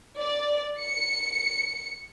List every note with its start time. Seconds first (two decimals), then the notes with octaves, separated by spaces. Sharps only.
0.19 D5
0.80 C#7